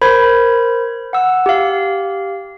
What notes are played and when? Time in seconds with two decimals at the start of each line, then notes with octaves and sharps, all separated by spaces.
0.02 A#4 C5 B5 G#6
1.13 F#5 E6
1.46 G4 F5